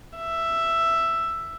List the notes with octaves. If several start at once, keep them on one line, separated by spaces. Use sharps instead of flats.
E5